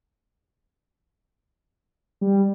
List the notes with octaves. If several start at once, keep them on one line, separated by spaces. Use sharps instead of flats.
G3